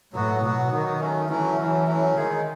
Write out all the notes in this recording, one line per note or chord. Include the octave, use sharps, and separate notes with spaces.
A2 F#3 B3 F#4
B2 F#3 B3 F#4
D#3 F#3 B3 F#4
F#3 A3 C#4
E3 F#3 A3 C#4
E3 F#3 A3 C#4
F#3 A3 C#4
D#3 G#3 D#4 G#4